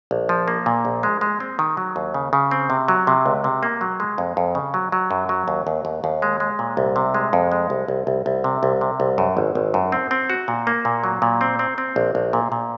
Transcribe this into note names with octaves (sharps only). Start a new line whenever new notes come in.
A#1
F3
A#3
A#2
A#1
G#3
G#3
C4
D#3
F#3
D#2
C#3
C#3
C4
C3
F#3
C3
C#2
C3
A#3
F#3
G#3
F2
F2
C#3
F#3
F#3
F#2
F#3
D#2
D#2
D#2
D#2
G#3
G#3
A#2
C2
C3
G#3
F2
G#3
C2
C2
C2
C2
C3
C2
C3
C2
F#2
G#1
G#1
F#2
C4
C4
F#4
A#2
A#3
A#2
F#3
A#2
C4
C4
C4
A#1
A#1
A#2
A#2